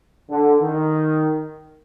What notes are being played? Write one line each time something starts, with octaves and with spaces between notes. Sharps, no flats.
D3
D#3